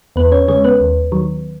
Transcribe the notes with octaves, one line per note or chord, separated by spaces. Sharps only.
E2 B3 B4
C#4 C#5
C#3 G#3 C#4 C#5
B3 B4
D#2
D#3 F#3